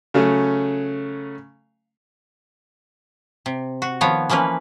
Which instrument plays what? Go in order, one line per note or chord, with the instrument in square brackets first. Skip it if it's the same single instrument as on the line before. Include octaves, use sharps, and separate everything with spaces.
[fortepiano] C#3 F#3 A3 C#4
[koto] C3
F#4
D#3 F3 B3 C#5
E3 F3 A#3 C#4 B4